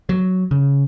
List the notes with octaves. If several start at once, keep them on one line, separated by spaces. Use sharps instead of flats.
F#3
C#3